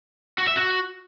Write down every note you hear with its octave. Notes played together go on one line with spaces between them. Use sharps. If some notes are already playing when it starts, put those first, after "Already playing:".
F#4
E5
F#4